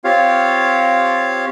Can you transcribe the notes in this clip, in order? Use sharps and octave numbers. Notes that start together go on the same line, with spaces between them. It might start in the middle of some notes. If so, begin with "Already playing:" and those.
C4 F4 G4 C#5 F5